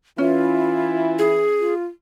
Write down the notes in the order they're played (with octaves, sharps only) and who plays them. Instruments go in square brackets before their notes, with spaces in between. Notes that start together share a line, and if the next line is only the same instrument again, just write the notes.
[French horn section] E3 E4 [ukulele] C#4 [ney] F4
[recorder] G#4
[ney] F4